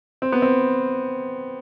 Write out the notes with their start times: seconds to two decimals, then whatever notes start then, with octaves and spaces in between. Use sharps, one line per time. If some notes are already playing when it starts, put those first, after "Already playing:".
0.22 C4
0.32 B3
0.42 C4